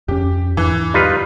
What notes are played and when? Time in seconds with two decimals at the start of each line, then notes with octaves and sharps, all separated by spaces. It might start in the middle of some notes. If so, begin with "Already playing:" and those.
0.08 F2 C#4 G4
0.57 E2 G#2 E3
0.94 G3 D#4 F4 B4